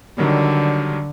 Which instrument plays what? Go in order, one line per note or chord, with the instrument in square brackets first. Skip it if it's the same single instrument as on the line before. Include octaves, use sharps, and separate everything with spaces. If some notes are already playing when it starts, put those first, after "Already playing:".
[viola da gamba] D3 [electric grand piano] D#3 F#3 G3